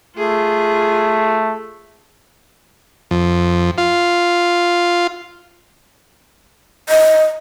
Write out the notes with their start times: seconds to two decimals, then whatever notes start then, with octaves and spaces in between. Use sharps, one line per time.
0.17 A3 F4 G#4
3.11 F2
3.78 F4
6.89 D#5